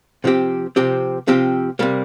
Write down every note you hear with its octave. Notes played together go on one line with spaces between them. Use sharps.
C3 F3 C4 G4
C3 F3 C4 G4
C3 F3 C4 G4
C3 G3 A#3